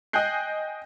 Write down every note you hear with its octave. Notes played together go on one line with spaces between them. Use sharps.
D#5 G5 G#5 F#6 G6 C7